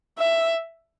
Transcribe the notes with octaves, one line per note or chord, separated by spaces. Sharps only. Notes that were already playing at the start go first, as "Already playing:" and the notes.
E5